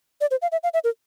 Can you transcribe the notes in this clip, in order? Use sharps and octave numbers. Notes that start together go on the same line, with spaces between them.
D5
C5
F5
E5
F5
E5
A#4